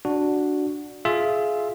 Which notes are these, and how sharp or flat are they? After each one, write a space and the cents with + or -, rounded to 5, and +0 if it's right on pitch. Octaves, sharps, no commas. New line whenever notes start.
D4 +0 F#4 +0
F4 +0 G#4 +20 E5 +0